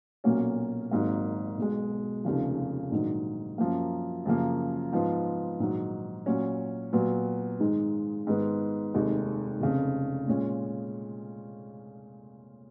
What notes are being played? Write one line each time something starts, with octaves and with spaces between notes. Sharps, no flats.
B1 A#2 F#3 A#3 C#4
G#1 G#2 F#3 A#3
B1 B2 G#3
F1 D#2 C#3 F3
A#1 G#2 D#3 F#3
F#2 F3 A#3
F#2 C#3 F3 A#3
G#2 F3 B3 F4
A#1 G#2 D#3 F#3
A#2 F#3 C#4
A#2 F#3 B3
G#2 D#3 G#3 D#4
G#2 D#3 G#3 B3
F1 D#2 D#3 G#3
F1 F2 C#3
A#2 G#3 C#4 F4